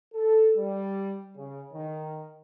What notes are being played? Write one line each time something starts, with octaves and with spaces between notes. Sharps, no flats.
A4
G3
C#3
D#3